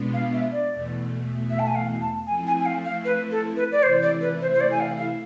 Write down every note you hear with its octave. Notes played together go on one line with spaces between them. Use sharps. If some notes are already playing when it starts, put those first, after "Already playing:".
Already playing: B2 G#3 B3 D4 F4
F5
E5
D5
E2 B2 A3
E5
A5
G#5
F5
A5
F3 A3 C4 E4 G#5
G#5
G#5
F5
F5
B4
A4
B4
D5
C3 E3 A3 E4 C5
D5
B4
C5
C5
D5
G#5
F5
F5